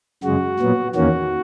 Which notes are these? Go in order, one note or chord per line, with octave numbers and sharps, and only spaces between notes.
F#2 C#3 G#3 F#4
A#2 F#3 B3
E2 D#3 A#3 C#4 F#4